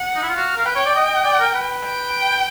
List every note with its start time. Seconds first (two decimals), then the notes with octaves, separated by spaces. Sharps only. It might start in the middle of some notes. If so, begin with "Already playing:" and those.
Already playing: F#5
0.16 D#4
0.22 E4
0.29 F4
0.36 F#4 F5
0.56 A#4
0.65 B4 G5
0.76 C#5
0.86 D5
0.96 D#5
1.10 D#5
1.24 D5
1.40 A#4
1.55 B4
1.85 G5